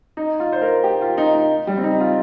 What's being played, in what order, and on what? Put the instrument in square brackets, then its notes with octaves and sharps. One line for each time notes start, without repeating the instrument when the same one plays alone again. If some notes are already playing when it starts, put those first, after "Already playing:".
[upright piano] D#4
F4
C5
A#4
G4
F4
D#4
D#4
G3
C4
D#4
F4